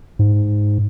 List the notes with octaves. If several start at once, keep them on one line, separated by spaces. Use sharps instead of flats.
G#2